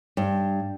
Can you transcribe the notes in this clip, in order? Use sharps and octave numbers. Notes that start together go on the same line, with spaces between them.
G2